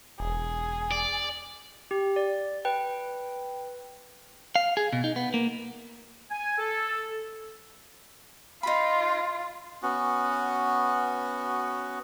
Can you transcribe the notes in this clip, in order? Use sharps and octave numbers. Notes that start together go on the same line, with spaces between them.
E1 G#4
D5
G4
D5
B4 G5
F5
G#4
B2
D#4
B3
A#3
G#5
A4
D#4 F4 B5
B3 C#4 F#4